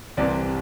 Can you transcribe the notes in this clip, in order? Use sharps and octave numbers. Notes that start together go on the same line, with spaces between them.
C2 C3 E3 C4 D5